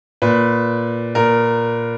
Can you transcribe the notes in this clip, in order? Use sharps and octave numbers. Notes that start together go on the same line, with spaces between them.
A#2 B4
A#2 A#4